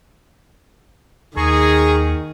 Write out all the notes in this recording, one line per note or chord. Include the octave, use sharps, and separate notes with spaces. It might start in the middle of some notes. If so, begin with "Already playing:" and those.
D#2 D#3 G#4 A#5 C#6